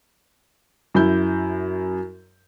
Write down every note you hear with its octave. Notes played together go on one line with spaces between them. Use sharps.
F#2 E4 G6